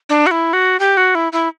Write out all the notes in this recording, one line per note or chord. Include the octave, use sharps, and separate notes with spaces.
D4
F#4
E4
F#4
G4
F#4
E4
E4